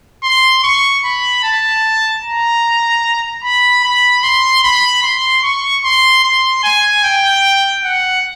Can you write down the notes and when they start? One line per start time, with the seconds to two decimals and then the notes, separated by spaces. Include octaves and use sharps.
0.24 C6
0.64 C#6
1.04 B5
1.44 A5
2.24 A#5
3.44 B5
3.84 B5
4.23 C6
4.64 B5
5.03 C6
5.43 C#6
5.84 C6
6.24 C6
6.64 G#5
7.04 G5
7.84 F#5